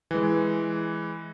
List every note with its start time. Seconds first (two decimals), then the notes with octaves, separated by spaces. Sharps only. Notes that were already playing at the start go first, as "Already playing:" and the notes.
0.11 E3 G#3